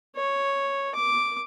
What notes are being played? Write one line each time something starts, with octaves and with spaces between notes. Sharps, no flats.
C#5
D6